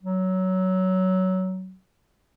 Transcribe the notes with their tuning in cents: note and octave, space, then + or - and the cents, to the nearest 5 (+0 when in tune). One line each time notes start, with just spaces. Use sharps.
F#3 +15